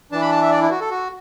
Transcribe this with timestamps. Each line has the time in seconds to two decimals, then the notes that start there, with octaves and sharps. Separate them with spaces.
0.12 E3 D4 A5
0.22 B5
0.32 A5
0.42 E5
0.51 D5
0.61 E4
0.71 F#4
0.81 A4
0.90 F#4